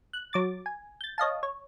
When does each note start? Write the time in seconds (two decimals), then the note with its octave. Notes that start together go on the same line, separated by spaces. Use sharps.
0.13 F#6
0.33 F#3 D6 A6
0.66 G#5
1.01 G6 A6
1.18 C#5 D#5 F5 A5
1.43 C#5